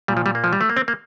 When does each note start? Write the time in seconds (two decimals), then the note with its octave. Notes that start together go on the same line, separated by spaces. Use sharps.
0.08 A#2 G3
0.17 F3
0.26 G3
0.35 A#3
0.44 F3
0.53 G3
0.61 A3
0.69 A#3
0.77 C4
0.88 A#3